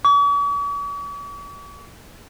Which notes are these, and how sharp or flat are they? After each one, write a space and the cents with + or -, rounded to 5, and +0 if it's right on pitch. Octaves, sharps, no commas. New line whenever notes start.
C#6 +45